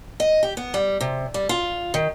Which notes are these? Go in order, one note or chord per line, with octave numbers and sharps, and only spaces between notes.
D#5
G4
B3
G3
C3
G3
F4
D#3